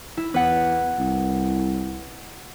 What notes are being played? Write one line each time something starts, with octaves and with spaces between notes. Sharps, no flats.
E4
E2 B4 F#5
C2